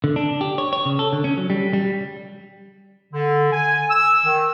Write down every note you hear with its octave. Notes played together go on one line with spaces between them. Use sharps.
D3
D4
G4
C#5
C#5
C#3
A4
D3
C#4
F#3
G3
G3
D3
G#5
E6
D#3